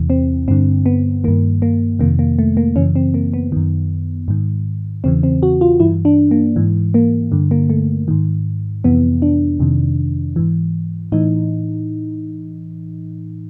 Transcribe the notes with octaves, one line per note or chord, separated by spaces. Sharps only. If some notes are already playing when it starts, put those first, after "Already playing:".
Already playing: E2 C3 E3
C4
G2 D3 C4
B3
G2 D#3 A#3
A#3
F2 C3 D#3 A#3
A#3
A3
A#3
F#2 C#3 E3 C#4
C4
A#3
B3
F#2 D#3
G#2 D#3
E2 C#3 E3 C4
C4
F#4
F4
G2 E3 E4
D4
A#3
G#2 E3
A#3
G2 D3
A#3
A3
G#2 D#3
F2 C3 E3 B3
D4
F2 C3 D#3
G#2 E3
A2 E3 D#4